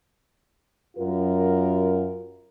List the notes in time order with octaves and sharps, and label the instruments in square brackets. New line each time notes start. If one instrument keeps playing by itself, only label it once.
[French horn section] F#2 F4 F#4 A#4